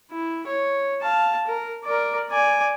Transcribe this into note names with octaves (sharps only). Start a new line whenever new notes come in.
E4
C#5
F5 A5
A#4
A#4 D5
D5 G#5